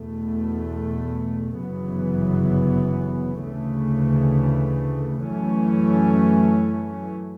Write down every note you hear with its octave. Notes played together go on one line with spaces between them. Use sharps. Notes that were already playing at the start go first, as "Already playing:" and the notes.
Already playing: E2 B2 A3
G1 F#2 C#3 E3 B3
D2 C#3 E3 A3
F#2 E3 A3 C#4